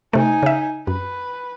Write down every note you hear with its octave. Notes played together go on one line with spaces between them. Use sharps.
C3 A3 D#4 G#5
C#3 E5
F#2 B4